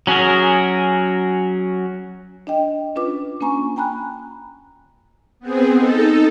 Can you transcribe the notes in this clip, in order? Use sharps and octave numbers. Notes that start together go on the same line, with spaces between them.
F#3 C#4 F#4 G#4 A#4
D4 D#5 G5
C#4 D4 F4 B4 D6
A#3 C#4 D4 G#5 A#5 C#6
G5 G#5 A#5 B5 F#6
B3 C4 G#4
D#4 A4